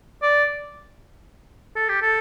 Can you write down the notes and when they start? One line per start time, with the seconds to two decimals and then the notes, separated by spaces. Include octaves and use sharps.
0.22 D5
1.76 A4
1.89 G4
2.02 A4